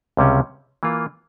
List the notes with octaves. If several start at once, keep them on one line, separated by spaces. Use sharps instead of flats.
C#2 C3 G3 C#4
E3 A#3 F4